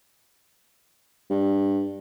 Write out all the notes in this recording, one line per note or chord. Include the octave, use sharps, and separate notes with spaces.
G2